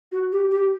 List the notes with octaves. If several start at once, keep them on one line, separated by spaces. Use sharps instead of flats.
F#4
G4
G4